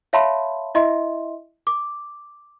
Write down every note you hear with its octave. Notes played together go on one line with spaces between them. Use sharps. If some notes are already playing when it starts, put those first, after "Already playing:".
C#5 E5 F5 A5 B5 C6
E4 D#5 E5 C6
D6